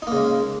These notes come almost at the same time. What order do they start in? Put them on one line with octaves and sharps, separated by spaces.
D#4 A#3 C#3 G#3